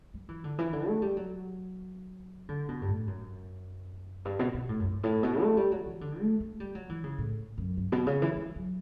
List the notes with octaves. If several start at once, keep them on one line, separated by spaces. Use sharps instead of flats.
G3
E3
D3
E3
D3
A3
G3
F#3
D3
B2
G2
A2
F#2
G2
B2
B2
A2
F#2
G2
A2
B2
A3
G3
F#3
E3
D3
A3
A3
G3
F#3
E3
C#3
A2
F#2
G2
B2
C#3
E3
G3
F#3